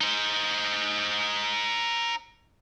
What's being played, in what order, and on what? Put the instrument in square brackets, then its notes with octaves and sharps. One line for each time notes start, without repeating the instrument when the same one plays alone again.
[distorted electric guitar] D#4 C5